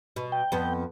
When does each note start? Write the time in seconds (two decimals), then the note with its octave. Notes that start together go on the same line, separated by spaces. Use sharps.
0.16 B2
0.32 G5
0.52 F2 B3